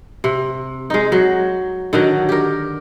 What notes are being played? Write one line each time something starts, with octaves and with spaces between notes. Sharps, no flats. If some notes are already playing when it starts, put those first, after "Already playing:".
C3
G#3 D#4
F#3
D3 D#3 F#3
G4 A#4